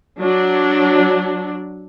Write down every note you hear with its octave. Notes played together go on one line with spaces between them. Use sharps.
F#3 D4